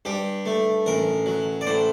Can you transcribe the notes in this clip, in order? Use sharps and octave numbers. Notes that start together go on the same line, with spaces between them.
G2 G4
A3
A1 A#4
F#3
D5
A2 C5